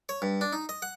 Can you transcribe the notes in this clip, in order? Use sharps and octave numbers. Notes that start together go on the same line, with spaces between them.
C#5
G2
D4
D#4
D#5
F#5